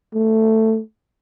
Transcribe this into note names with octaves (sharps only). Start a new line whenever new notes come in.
A3